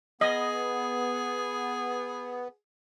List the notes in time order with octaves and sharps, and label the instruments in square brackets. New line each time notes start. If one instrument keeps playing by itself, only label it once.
[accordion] B3 [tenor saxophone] G#4 [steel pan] D#5